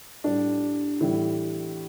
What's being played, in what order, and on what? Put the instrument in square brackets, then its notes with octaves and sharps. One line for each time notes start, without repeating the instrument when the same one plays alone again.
[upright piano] A2 G3 D4
A2 E3 G3 E4